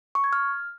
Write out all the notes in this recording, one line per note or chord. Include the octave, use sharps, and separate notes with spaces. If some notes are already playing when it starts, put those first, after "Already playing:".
C#6
G#6
F6